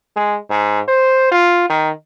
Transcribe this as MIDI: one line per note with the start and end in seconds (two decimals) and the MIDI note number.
0.16 0.38 56
0.50 0.80 44
0.88 1.30 72
1.32 1.67 65
1.69 1.90 51